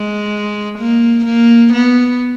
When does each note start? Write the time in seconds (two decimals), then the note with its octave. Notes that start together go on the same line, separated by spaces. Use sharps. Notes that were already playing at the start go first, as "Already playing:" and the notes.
Already playing: G#3
0.79 A#3
1.25 A#3
1.73 B3